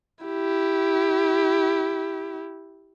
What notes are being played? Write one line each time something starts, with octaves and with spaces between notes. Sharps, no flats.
E4 G4